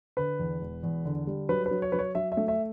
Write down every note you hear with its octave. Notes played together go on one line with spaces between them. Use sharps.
D3 B4
E2
E1
E2
D3
G3
F#3 B4
B4
F#3
C#5
F#3 B4
C#5
F#3 E5
E5
A3
E5